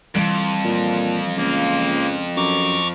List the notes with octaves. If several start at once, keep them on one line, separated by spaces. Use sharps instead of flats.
F2 E3 G3
A#2
C#2 A#3
F#2 A#5 C#6 D6